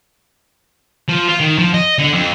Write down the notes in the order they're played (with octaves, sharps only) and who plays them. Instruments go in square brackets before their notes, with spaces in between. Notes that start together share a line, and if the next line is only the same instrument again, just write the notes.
[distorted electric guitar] F3
F4
D#3
F3
D#5
D3
F2